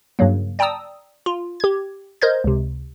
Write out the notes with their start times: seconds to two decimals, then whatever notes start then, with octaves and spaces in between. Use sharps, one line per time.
0.19 G2 C#3 F#3 A#3
0.59 D5 G5 A5 A#5 D#6 E6
1.26 F4
1.60 G4 G#6
2.22 A#4 C5 D#5 G6 G#6
2.44 C#2 C3